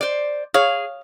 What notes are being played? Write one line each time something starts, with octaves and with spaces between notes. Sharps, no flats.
C5 D5
G#4 C#5 F5